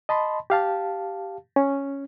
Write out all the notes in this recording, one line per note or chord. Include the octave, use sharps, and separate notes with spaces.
D#5 A5 B5 C6
G4 F5 A5
C#4